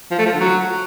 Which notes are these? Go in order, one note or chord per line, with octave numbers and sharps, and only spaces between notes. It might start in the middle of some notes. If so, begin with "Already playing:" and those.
F3
A3
F3
D3
F#3